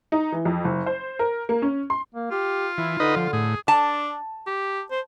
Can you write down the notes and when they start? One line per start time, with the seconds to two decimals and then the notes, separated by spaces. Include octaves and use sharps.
0.12 D#4
0.32 E3
0.45 F2
0.65 F#1
0.86 C5
1.19 A#4
1.49 A#3
1.62 C#4
1.90 C6
2.15 A#3
2.31 F4 G4
2.78 E3 E4
3.00 D3 D#4 B4 D#5
3.17 F3
3.33 A2 G#4
3.68 D4 A5
4.47 G4
4.91 C5